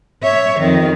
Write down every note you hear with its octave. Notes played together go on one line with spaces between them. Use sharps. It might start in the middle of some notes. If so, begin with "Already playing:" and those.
C#5 E5
F2 D#3